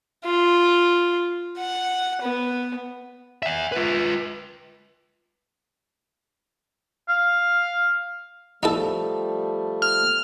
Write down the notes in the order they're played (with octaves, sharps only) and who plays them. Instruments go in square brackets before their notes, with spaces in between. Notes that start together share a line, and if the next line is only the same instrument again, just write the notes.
[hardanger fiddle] F4
F#5
B3
[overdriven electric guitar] E5 F#5
F4 B4
[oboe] F5
[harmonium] F3 G3 A3 [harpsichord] D#4 E4 A4
[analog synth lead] F6